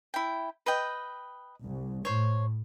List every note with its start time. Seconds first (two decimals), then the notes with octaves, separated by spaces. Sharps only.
0.14 E4 G5
0.66 B4 D#5 G5
1.61 C2
2.05 A2 C5 C#5